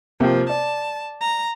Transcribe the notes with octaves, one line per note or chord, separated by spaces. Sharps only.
C3 F3 A#3 G5
D5 A5
A#5